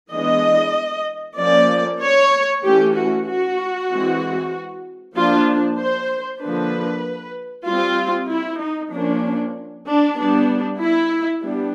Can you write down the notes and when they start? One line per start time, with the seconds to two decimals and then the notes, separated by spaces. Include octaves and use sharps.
0.12 E3 G#3 B3 D4 D#5
1.38 F3 A#3 C#4 D5
2.02 C#5
2.64 E3 A3 C#4 G4
2.95 F#4
3.26 F#4
3.90 E3 G#3 C4
5.15 F3 A#3 D4 F4
5.78 C5
6.40 D3 F3 A#3 D4 B4
7.66 G3 C4 F4
8.29 E4
8.60 D#4
8.92 F3 A#3 C#4 D4
9.86 D4
10.18 G3 B3 D4
10.80 E4
11.43 G3 B3 D4